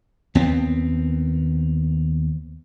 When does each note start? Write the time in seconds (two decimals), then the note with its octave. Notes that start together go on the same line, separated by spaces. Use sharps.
0.35 D#2 B3 C4